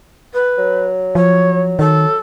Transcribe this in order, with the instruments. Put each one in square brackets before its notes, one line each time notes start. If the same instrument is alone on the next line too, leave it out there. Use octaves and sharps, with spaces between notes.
[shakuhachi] B4
[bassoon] F#3
[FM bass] F3 [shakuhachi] C#5
[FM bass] D#3 [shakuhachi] A4